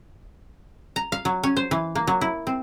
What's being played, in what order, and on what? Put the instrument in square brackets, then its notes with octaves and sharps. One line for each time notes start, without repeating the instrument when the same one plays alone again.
[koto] A#5
F5
F#3
C#4
C5
E3
A#3
F#3
E4
C4